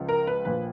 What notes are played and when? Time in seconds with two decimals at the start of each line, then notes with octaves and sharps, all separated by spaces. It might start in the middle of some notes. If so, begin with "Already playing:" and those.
Already playing: C#2 C#3 F3
0.09 A#4
0.27 B4
0.45 A#1 A#2 F3 B4